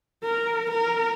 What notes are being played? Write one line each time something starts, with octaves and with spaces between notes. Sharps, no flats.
A#4
A#4